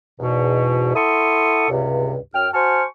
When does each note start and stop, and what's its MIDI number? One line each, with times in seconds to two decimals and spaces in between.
0.20 0.94 40
0.20 0.94 44
0.20 0.94 47
0.95 1.66 64
0.95 1.66 69
0.95 1.66 78
0.95 1.66 84
0.95 1.66 85
0.95 1.66 87
1.70 2.17 37
1.70 2.17 43
1.70 2.17 48
2.34 2.48 42
2.34 2.48 79
2.34 2.48 89
2.54 2.84 66
2.54 2.84 72
2.54 2.84 80
2.54 2.84 81
2.54 2.84 85
2.54 2.84 89